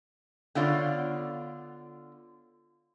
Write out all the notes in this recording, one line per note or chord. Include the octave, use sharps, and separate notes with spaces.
D3 B3 F4 C#5 D5 F5